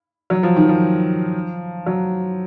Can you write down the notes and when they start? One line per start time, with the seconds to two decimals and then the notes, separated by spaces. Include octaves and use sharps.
0.30 F#3
0.43 F3
0.56 D#3
0.69 F3
1.86 F#3